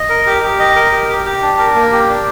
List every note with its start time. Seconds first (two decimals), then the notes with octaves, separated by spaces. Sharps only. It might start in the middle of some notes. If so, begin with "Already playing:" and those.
Already playing: D#5
0.09 A#4
0.26 G4
0.42 G4
0.59 D#5
0.76 A#4
0.92 G4
1.09 G4
1.26 G4
1.42 D4
1.59 A#4
1.75 A#3
1.92 G4
2.09 D4